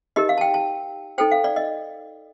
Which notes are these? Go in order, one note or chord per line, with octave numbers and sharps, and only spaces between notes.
D#4 G4 A#4 D#5
F5
A5
G5
A5
D#4 A4 C5 G5
F5
D5
D#5